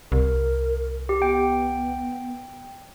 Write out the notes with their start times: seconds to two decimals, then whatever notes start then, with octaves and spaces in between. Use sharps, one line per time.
0.12 C2 A#4
1.09 G4
1.22 B3 G5